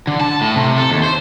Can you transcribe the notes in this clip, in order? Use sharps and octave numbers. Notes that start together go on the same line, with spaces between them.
D3
A5
A2
C3
A4
D#2
C5